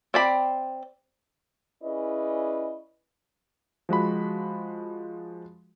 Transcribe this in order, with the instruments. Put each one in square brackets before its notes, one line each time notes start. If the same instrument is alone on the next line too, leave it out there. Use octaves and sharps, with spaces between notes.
[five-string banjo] C4 D5 B5
[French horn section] C#4 E4 G#4 B4 D5 D#5
[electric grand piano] F3 G#3 F#4 B5